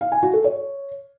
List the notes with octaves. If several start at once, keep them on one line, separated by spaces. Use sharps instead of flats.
F5
G#5
F#4
A4
C#5